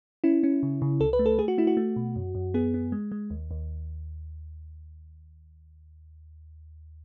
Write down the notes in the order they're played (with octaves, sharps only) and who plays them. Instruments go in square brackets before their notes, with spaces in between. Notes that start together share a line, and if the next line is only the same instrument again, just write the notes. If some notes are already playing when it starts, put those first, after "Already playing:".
[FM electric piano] C#4 E4
C#4
C#3
C#3
C#2 A4
B4
A3
A4
A3 G#4
F#4
A3 E4
F#4
A3
B2
F#2
F#2
B3 G#4
B3
G#3
G#3
D#2
D#2